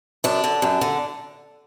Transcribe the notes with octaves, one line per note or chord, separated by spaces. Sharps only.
F#2 D4
D3
F#2
D3